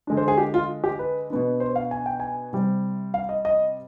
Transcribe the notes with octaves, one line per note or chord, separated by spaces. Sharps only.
D3 G#3 D4
C5
G#4
G4
F4
G4
B4
B2 B3 D4
C5
F5
G#5
G5
G#5
C3 G3 C4
F5
D#5
D#5